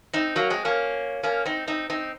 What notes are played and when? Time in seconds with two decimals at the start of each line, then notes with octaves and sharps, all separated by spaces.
0.13 C4 D#4
0.36 F#3 A#3
0.50 G#3 C4
0.65 A#3 C#4
1.23 A#3 C#4
1.45 C4 D#4
1.68 C4 D#4
1.90 C4 D#4